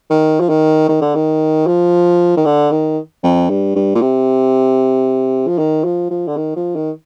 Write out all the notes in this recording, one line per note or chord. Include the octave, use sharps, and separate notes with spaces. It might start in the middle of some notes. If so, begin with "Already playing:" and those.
D#3
F3
D#3
D#3
D3
D#3
F3
D#3
D3
D#3
F2
G2
G2
A#2
C3
F3
D#3
F3
F3
D3
D#3
F3
D#3